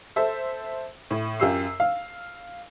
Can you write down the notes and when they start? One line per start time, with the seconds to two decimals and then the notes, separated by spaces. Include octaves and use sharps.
0.16 A4 C5 E5
1.11 A2
1.40 F#2 F4 G4 E6 C7
1.80 F5